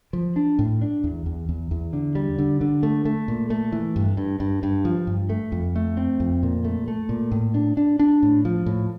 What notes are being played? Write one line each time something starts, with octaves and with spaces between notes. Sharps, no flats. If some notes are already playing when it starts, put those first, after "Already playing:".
F3
D4
A2
D4
E2
E2
E2
E2
D3
G3
D3
D3
A3
A3
A#2
A3
E3
G2
G2
G2
G2
F3
G2
A3
F2
A3
C4
F2
A#2
A3
A3
A#2
A2
D4
D4
D4
A2
F3
A2